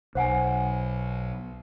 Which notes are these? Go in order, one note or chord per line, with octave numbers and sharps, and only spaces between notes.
B1 C5 F#5 G#5